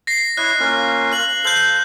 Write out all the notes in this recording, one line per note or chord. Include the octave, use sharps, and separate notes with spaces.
A#6 C7
E4 C#5 D#5 F#6
A#3 C#4 F4
F#6 F#7
A4 C5 F5 G6 F#7